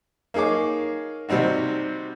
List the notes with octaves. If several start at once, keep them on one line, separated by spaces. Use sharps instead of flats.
A#3 D#4 G#4 C#5 D6
C3 G3 C4 D#4 F#4